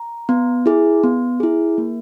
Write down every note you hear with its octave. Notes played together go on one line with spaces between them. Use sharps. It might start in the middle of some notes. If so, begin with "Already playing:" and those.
Already playing: A#5
B3
E4 G#4
B3
E4 G#4
A#3